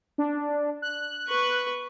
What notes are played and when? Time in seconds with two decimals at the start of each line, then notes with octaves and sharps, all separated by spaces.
0.18 D4
0.82 F#6
1.28 B4 C#6